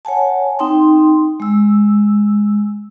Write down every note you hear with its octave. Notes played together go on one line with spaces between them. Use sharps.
C#5 F#5 G#5 A5
C4 D#4 G5 C6
G#3 E6